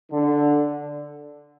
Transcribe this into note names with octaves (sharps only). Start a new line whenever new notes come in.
D3